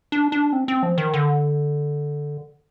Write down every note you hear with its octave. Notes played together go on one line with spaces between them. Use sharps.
D4
D4
C4
C4
F3
D#3
D3